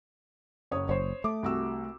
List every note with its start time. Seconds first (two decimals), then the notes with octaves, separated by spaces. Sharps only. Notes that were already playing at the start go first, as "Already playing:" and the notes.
0.71 F#1 C#5 D#6
0.89 F#1 C5 C#5
1.24 A3 D6
1.43 C2 F#4 E6